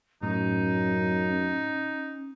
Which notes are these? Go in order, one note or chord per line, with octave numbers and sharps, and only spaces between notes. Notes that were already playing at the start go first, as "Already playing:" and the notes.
F#2 A2 C#4 D#4